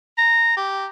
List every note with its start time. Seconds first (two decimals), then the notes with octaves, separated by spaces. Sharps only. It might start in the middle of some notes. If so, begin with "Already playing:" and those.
0.18 A#5
0.57 G4